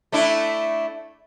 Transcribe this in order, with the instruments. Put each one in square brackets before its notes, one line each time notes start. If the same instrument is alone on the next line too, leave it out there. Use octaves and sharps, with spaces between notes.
[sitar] A3 D4 E4